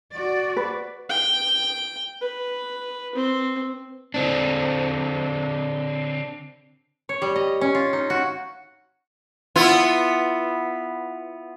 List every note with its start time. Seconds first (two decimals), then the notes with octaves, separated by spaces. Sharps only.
0.13 F#4 D5
0.56 B4
1.09 G5
2.21 B4
3.15 C4
4.14 D3 C4 D4
7.09 C#5
7.22 G3
7.36 D#5
7.61 C#4
7.75 F4
7.93 D#4
8.10 F#4
9.56 B3 E4 F4